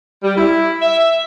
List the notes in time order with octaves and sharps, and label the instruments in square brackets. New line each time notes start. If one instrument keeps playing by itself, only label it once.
[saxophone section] G3
E4
E5